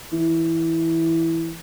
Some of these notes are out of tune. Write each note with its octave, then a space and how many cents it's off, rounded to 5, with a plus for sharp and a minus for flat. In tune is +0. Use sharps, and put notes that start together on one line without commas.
E3 -5